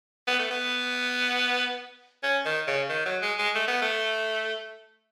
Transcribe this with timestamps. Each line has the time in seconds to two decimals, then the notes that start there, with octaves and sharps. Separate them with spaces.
0.27 B3
0.39 A3
0.51 B3
2.23 C#4
2.45 D#3
2.67 C#3
2.89 D#3
3.05 F#3
3.22 G#3
3.38 G#3
3.55 A3
3.68 B3
3.82 A3